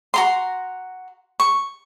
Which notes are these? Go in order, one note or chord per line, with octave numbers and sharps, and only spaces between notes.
F#4 A#5 C6
C#6